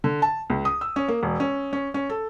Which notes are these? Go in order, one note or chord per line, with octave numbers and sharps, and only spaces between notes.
D3
A5
C#2
D#6
E6
C#4
A#3
E1
C#4
C#4
C#4
A4